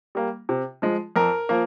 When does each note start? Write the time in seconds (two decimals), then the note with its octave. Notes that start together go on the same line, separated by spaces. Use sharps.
0.15 G3 A#3
0.49 C3
0.82 F3 G#3
1.16 F2 A#4
1.49 F3 A#3